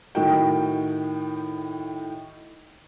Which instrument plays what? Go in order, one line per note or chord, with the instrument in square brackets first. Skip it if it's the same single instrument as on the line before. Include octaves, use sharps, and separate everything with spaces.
[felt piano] A2 D#3 D#4 F#4 A#4 G5